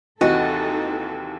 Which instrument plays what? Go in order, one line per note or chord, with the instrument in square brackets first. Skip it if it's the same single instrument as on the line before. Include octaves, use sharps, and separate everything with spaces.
[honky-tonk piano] D#2 C3 E3 [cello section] D#4 A4 [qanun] F#4 [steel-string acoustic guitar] D#5